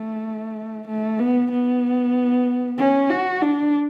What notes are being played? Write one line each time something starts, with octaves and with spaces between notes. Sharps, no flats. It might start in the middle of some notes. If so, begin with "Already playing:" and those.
Already playing: A3
A3
B3
B3
C#4
F#4
D4